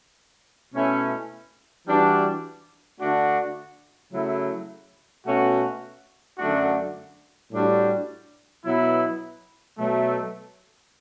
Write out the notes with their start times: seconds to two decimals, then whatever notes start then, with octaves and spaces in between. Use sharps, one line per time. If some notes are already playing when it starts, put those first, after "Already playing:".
0.72 B2 A3 C#4 E4
1.85 E3 G3 D4 F#4
2.98 D3 A3 D4 F#4
4.11 C#3 F#3 A3 E4
5.25 B2 A3 C#4 F#4
6.38 F#2 D3 A3 D4 F#4
7.51 A2 G3 D4 F#4
8.64 B2 F#3 B3 E4
9.78 B2 F#3 A3